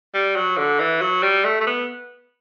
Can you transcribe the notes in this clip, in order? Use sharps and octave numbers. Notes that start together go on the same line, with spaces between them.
G3
F#3
D3
E3
F#3
G3
A3
A3
B3